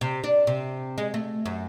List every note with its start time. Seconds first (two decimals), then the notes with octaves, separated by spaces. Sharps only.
0.01 C3
0.24 D4
0.47 C3
0.98 G#3
1.14 A3
1.46 F#2